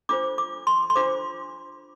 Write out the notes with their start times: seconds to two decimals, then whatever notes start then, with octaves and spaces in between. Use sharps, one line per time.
0.09 D4 F4 C5 D6
0.38 D6
0.67 C6
0.90 C6
0.96 D4 F4 C5 D6